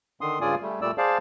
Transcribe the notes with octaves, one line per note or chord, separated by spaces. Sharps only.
D3 D#3 C6 D#6
G2 C#3 F4 D5 G#5 D#6
G3 A3
A#2 G3 A3 D5 E6
G#4 C5 D5 F5 A5